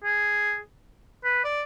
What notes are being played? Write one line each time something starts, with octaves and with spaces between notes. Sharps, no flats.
G#4
B4
D5